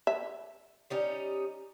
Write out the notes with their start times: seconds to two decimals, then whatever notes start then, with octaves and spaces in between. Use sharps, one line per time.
0.07 E5
0.90 G3 C#4 D#4